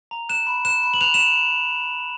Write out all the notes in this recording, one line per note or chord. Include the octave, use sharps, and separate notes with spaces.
A#5
F#6 E7
B5
F#6 E7
B5
F#7
F#6 F7
E7